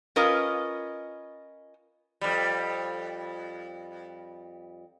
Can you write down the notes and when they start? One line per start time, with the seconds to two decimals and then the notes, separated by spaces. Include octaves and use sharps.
0.16 C#4 F4 A#4 B4 D#5
2.21 F2 G3